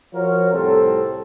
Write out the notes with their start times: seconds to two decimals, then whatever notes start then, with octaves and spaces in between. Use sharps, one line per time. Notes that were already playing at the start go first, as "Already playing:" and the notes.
0.13 F3 F4 F#4 A#4 C#5
0.52 C2 A2 C4 A4